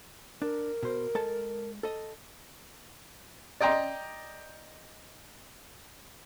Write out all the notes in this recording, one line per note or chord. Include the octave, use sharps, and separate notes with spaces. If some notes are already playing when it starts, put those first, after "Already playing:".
D4 A#4
B2 C5
G#3 A4 A5
A4 D#5
D5 D#5 G5 A#5 C6